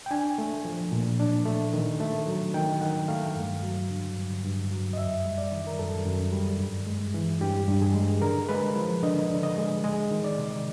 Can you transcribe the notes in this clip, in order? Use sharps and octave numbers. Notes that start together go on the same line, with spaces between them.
G5
D4 G#5
A3
F3
A#2
D4
A3
D#3
A3
F#3
D#3 G5
D#3 F#5
A3 F5
G2
F#3
D3
G2
G2
F#3
D#5
F#2 E5
G3
D5
D#3
A#4
F#2 A4
F#2
G3
G2
G#3
E3
G2 G4
G2
G#4
G#3
D3 A#4
G#3 B4
F3
D3 D#5
D3
D#5
G#3
G#3 D#5
D#3
D5
C3